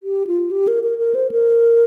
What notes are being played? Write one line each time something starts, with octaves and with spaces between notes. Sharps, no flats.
G4
F4
G4
A#4
A#4
A#4
C5
A#4